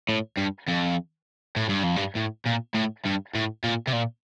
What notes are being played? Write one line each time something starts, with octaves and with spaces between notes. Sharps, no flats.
A2
G2
F2
A2
G2
F2
G2
A2
A#2
A2
G2
A2
A#2
C3
A#2